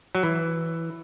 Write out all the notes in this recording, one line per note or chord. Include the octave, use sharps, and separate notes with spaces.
F#3
E3